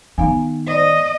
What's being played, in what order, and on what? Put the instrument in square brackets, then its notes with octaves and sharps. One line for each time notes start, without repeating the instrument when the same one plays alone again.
[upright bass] D#3 [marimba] B3 F5 G#5
[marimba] C5 D5 [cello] D#5